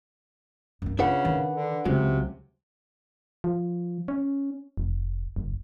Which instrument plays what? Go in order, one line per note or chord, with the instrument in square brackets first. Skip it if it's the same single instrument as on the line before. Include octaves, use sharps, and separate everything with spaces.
[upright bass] F#2 D4
[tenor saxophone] C#3 [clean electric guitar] D4 B4 F#5 [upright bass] F4
[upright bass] D#3
[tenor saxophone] D3
[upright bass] C#2 [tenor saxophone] C3 [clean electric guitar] F#3 G#3 F#4
[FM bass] F3
C#4
F1
F#1